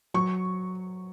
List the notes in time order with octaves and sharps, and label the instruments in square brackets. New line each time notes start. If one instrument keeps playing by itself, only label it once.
[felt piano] F#3 C#6